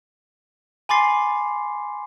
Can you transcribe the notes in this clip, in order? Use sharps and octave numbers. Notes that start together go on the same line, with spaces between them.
G#5 B5 C6 D6 A6 C7